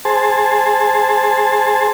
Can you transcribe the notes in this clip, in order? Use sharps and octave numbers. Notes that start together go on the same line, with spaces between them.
G#4 C5 A5